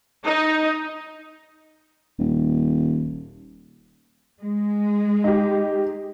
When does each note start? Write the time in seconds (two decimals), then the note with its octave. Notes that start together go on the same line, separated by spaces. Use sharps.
0.25 D#4
2.19 D#1
4.41 G#3
5.24 D#4 G4